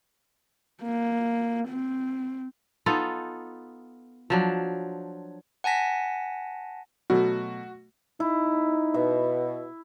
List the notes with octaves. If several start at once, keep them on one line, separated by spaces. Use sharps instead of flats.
A#3
C4
B3 D#4 F4 A4
F3 F#3 D4
F#5 G#5 A5 A#6 B6
B2 F#3 A3 F#4
D#4 E4
B2 E5